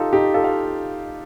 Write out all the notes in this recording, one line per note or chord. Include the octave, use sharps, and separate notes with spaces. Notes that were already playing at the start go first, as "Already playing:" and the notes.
Already playing: D#4 F4 G4 A4
D#4 G4
F4 A4
F5